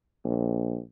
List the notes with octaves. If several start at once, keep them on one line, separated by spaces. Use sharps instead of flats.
A#1